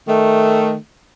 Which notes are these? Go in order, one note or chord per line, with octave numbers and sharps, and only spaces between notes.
D#3 A3